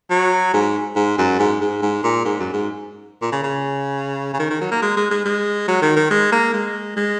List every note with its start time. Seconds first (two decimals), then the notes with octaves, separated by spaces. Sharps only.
0.11 F#3
0.54 G#2
0.96 G#2
1.18 F#2
1.39 G#2
1.61 G#2
1.82 G#2
2.04 A#2
2.25 G#2
2.40 F#2
2.54 G#2
3.22 A#2
3.32 C#3
3.43 C#3
4.34 C#3
4.39 D#3
4.50 D#3
4.61 F#3
4.71 A#3
4.82 G#3
4.97 G#3
5.11 G#3
5.25 G#3
5.68 F#3
5.82 D#3
5.96 D#3
6.11 G#3
6.32 A#3
6.54 G#3
6.97 G#3